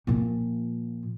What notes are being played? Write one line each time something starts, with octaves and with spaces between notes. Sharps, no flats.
A#2 F3